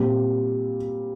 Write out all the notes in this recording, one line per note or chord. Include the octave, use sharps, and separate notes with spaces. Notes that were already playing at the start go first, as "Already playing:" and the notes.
Already playing: A#2 G3 C4